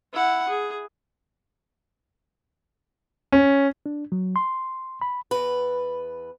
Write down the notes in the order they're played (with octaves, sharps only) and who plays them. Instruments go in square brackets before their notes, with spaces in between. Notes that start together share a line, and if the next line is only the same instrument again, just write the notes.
[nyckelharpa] E4 F#5
G#4
[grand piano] C#4
[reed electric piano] D4
F#3
C6
B5
[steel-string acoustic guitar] E2 B4